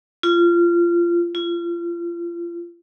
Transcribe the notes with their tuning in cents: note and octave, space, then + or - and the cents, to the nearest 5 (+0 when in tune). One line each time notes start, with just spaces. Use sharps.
F4 -20
F4 -30